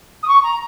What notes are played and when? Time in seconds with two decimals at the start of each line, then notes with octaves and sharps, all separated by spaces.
0.23 D#6
0.28 C#6
0.43 A#5